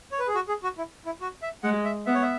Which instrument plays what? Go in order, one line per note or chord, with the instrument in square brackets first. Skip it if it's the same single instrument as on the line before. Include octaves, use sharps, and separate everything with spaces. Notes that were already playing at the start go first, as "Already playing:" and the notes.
[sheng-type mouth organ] C#5
B4
G#4
F#4
G#4
F#4
E4
E4
F#4
E5
[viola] G#3 [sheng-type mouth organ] F#5
[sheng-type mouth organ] E5
[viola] B3 [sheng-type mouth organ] E5
[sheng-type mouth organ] C#5
E5